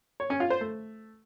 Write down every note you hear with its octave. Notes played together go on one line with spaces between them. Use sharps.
C#5
C#4
F4
C5
A3